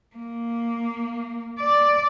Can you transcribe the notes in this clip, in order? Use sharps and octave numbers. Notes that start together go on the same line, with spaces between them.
A#3
D5